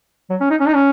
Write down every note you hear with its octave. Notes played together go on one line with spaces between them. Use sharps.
F#3
C#4
D#4
C#4
D#4
C#4